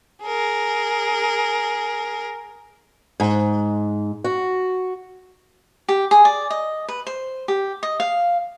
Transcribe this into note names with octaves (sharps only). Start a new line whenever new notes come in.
G#4 A#4
G#2
F#4
G4
G#4
D5
D#5
B4
C5
G4
D#5
F5